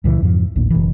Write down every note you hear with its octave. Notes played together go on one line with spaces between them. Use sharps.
C#2 A#2 C#3 E3
F2 G#2 F3
A1 D#2 A#2 D4
F#1 B2 E3